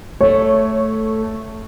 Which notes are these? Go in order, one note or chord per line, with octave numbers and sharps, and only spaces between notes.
A3 C#5